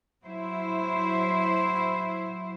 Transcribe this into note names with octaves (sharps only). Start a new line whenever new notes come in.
F#3 E4 C5